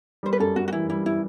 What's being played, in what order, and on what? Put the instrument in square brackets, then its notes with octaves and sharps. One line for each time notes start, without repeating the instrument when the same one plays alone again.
[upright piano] G3 [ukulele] C5
[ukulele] B4
[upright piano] F#2 [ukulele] A4
[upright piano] F#2 [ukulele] F#4
[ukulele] F#4
[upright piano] E3 [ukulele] E4
[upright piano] G3 [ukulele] E4
[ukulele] E4